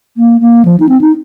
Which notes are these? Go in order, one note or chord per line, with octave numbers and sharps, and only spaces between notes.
A#3
A#3
F3
D#4
C4
D#4